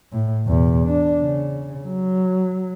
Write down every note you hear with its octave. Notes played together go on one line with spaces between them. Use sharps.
A2
E2 B2
D4
C#3
F#3